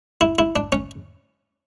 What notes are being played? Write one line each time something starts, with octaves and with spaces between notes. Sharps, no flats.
E4
E4
D4
C#4